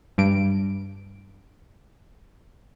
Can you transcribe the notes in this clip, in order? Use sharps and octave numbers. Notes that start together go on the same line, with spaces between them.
G2 D7